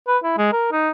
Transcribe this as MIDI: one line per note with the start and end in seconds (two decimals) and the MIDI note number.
0.07 0.18 71
0.23 0.34 64
0.38 0.51 56
0.52 0.71 70
0.72 0.90 63